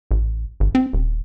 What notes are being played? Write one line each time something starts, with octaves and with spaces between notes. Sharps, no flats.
A1
G#1
C4
D#1